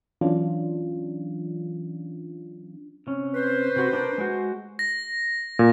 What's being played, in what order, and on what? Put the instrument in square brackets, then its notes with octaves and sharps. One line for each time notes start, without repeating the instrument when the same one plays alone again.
[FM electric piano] E3 F#3 C#4 D4 F4
[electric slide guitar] C3 C#4
[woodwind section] B4 C5
[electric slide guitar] C3 F#4
D4 A#4 D5
G#3 F#4
[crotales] A#6
[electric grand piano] A#2